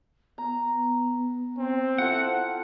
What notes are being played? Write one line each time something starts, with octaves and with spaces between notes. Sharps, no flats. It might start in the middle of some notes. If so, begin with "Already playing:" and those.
B3 A#5
C4
E4 F4 A4 F#5